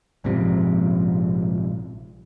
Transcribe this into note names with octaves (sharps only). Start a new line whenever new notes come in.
A#1 G#2 C3 F3